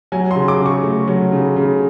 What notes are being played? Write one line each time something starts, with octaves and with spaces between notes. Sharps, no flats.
F#3 G#5
C6
C#3
D6
C#3
C#6
A3
F#3
C#3
C#3